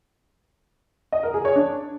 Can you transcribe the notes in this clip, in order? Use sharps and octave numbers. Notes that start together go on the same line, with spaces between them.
D#5
A#4
G#4
C#5
D4